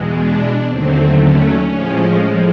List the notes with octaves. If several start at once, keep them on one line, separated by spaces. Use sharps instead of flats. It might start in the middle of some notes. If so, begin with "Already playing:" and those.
Already playing: E2 B2 G#3
D4
D#2 D3 F#3 A3 C4
C#4
A2 F3 G#3